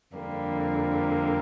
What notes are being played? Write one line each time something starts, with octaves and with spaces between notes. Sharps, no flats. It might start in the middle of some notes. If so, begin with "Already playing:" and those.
F2 D3 G3 A#3